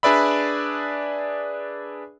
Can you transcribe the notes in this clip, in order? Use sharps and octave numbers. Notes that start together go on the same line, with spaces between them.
D4 G#4 B4 D5 E5 B5